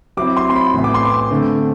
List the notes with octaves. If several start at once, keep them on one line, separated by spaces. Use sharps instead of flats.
F#3 C4 E4 D6
C6
C6
B5
A2 E3 B3
D6
C6
D6
D3 A3 C4